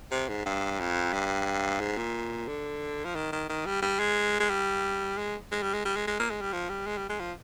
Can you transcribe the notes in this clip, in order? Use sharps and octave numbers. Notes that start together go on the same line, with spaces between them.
C3
G#2
G2
F2
G2
G#2
A#2
D3
F3
D#3
D#3
D#3
G3
G3
G#3
G#3
G3
G#3
G#3
G3
G#3
G3
G#3
G#3
A#3
G#3
G3
F3
G3
G#3
G3
G#3
F3